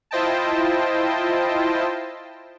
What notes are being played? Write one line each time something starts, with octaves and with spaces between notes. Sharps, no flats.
E4 F4 C5 D#5 G5 A5